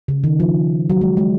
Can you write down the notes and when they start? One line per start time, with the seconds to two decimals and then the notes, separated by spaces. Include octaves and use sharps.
0.08 C#3
0.24 D#3
0.40 F3
0.90 F#3
1.01 G#3
1.17 G#3